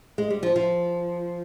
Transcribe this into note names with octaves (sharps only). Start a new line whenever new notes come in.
G#3
G3
F3
F3